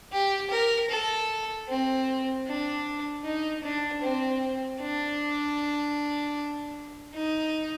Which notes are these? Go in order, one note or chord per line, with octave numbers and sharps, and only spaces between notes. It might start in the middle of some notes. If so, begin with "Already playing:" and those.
G4
A#4
A4
C4
D4
D#4
D4
C4
D4
D#4